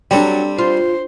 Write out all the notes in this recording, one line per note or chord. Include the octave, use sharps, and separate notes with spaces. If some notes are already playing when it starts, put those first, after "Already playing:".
F#3 G3 C4 D4 A4 G5
F4 C5